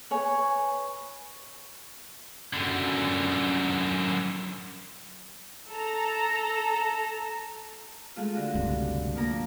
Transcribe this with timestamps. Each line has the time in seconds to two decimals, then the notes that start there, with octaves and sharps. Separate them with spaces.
0.11 B4 C#5 G#5
2.53 F#2 D3
5.68 A4 A#5
8.16 G#3 A3 F4
8.35 D3 F#4
8.55 C#2 G2 C3
9.15 F3 A#3 A#5